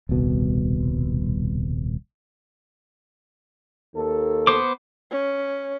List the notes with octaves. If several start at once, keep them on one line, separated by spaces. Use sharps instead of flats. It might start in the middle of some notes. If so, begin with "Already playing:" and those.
D#1 C2 B2
D#2 A4
B3 C5 D6
C#4